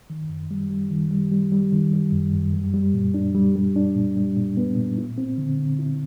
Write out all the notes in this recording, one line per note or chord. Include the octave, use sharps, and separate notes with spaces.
D#3
F#2
G3
G3
D#3
G3
G3
G3
D#3
G3
F#2
F#2
G3
G3
A#2
D4
G3
G3
D4
A#2
G3
A#2
B3
A#2
E4
C4
D3
D3
E4